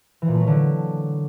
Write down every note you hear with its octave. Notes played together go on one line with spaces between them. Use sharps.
E3
A#2
A3
F#3
D3